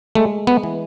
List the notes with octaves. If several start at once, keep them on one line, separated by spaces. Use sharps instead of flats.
G#3 A3
B3
E3